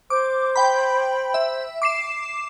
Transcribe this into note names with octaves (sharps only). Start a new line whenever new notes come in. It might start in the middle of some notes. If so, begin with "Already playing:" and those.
C5 D6
G5 B5
E5
D6 C7 E7